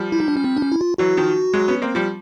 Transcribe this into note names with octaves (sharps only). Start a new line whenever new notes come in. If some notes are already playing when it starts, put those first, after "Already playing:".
Already playing: F3 G3
E4
D#4
D4
C#4
C4
D4
C#4
E4
F4
E3 F#3 F#4
D#3 F3
F#3 G#3
B3 C#4
A#3 C4
F3 G3